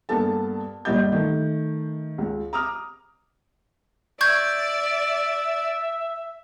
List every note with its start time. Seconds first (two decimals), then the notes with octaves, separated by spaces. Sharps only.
0.09 G2 A#3 B3 A4 A5
0.85 G1 A#2 G3 D#5 G6
1.12 D#3 A3
2.18 C#2
2.53 A#5 D6 D#6 F6
4.21 D5 E5 C#6 G6 G#6